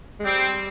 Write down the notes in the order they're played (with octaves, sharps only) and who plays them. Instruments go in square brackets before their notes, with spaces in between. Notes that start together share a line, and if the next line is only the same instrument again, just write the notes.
[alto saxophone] G#3
[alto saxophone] G3 [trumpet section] C4